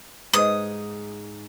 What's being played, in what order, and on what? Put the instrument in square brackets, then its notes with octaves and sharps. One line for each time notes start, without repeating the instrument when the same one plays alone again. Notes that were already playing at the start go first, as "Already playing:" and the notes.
[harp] G#2 [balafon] B4 C5 D#5 [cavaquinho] D#6